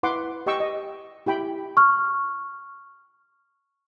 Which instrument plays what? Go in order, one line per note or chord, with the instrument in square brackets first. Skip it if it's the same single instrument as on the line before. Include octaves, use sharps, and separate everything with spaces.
[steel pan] E4 B4 F#5 C6 D6
G4 D#5 G5 C#6 E6
D#5
E4 G4 G5 B5
[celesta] C#6 F6